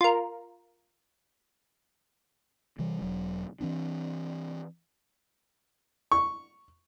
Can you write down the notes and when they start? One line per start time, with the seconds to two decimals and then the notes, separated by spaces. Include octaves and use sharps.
0.01 F4 A#4
2.79 C3 E3 G3
3.02 E1 F#3
3.60 E3 C4 D4
6.12 C#6